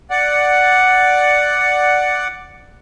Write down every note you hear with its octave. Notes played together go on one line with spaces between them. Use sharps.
D5 F#5